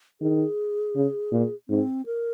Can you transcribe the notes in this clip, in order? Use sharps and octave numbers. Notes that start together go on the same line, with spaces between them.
D#3 G#4
C#3
A#2
G#2 C4
A#4